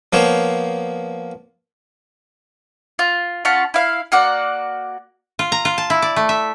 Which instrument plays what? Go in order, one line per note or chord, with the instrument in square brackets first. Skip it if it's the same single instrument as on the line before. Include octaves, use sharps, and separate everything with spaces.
[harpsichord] F3 A#3 B3 C5 C#5
[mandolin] F4
C#4 F4 F#5 A5
E4 F5
A#3 F#4 D5 F#5
[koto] F4
A#5
F4
A5
E4
D5
A3
E5